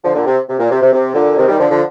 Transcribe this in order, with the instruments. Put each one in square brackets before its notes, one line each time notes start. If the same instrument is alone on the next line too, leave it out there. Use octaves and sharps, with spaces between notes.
[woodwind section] D3 F3
A#2 D3
C3
C3
A#2
C3
C3
C3
A#2 D3
C3 D#3
D#3 G3
D3 F3
D3 F3